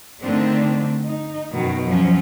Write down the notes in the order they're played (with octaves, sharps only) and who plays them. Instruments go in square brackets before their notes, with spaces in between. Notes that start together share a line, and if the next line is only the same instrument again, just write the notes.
[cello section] D3 D#3 A3 C4 D4
D#4
F#2 B2 D#3 F#3
F3 F#3 C#4